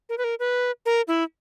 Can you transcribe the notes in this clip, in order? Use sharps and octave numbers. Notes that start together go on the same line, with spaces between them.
A#4
B4
A#4
B4
A#4
E4